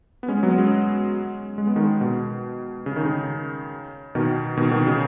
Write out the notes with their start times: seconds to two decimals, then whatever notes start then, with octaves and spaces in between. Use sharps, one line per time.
0.23 B3
0.28 G#3 C#4
0.43 F#3 B3
0.58 G#3 C#4
1.58 G#3
1.67 B3
1.76 D#3 G#3
2.01 B2
2.86 C#3
2.96 D#3
3.05 C#3
4.15 B2 D#3
4.57 B2 D#3
4.71 B2 D#3
4.87 C#3